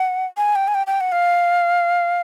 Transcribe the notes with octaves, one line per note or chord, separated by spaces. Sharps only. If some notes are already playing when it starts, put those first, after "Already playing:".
Already playing: F#5
G#5
G5
G#5
G5
G5
F#5
F5